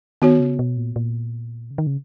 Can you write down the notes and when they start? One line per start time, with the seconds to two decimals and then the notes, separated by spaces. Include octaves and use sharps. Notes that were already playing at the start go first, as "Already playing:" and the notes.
0.22 D#3 B3 F#4 C#5
0.40 C#3
0.59 B2
0.77 A#2
0.96 A#2
1.71 C#3
1.78 D#3
1.87 C#3